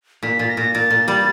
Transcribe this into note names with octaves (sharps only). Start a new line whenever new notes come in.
A#2 B6
A#2 A6
A#6
A#2
A#2 A6
A#2
G3